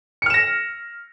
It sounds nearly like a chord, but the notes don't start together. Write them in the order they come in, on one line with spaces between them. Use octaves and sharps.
C#7 F6 E7 A#6